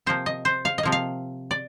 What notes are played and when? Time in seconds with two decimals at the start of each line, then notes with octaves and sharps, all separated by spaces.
0.06 C3 F3 A#3 C5
0.26 D#5
0.45 C5
0.65 F5
0.78 D#5
0.83 C3 F3 A#3
0.92 F5
1.51 D5